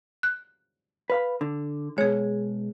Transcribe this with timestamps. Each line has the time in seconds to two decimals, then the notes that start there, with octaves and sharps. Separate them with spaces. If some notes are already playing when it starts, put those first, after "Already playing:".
0.23 F#6
1.10 B4 F5 B5
1.41 D3
1.98 B2 G#3 G#4 C#5